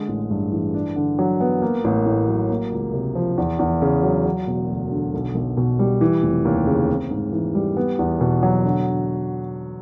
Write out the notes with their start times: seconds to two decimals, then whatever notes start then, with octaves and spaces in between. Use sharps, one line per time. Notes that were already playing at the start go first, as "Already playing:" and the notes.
Already playing: D3 G#3
0.09 A1
0.31 G2
0.52 E3
0.74 D4
0.96 D3
1.19 F#3
1.40 B3
1.62 A#3
1.84 A1
2.06 A2
2.28 F#3
2.50 A#3
2.72 C#2
2.94 C3
3.15 F3
3.38 E2
3.59 E2
3.82 C#3
4.03 F#3
4.26 F#3
4.47 E1
4.69 D2
4.91 D3
5.14 B1
5.35 B1
5.57 B2
5.79 G3
6.01 E3
6.23 F1
6.45 D#2
6.67 C#3
6.89 C4
7.11 G#2
7.33 E3
7.55 G3
7.77 B3
7.99 E2
8.21 B2
8.43 F#3
8.65 D3
8.86 D3